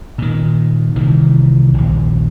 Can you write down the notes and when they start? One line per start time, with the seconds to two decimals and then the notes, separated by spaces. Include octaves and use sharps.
0.18 A#2 D#3
0.96 C2 D#3 E3
1.74 A#1 D#2